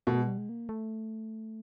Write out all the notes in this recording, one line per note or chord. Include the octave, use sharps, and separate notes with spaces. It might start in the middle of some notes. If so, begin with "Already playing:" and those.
B2 A3
G#3
G3
G#3
A#3
A3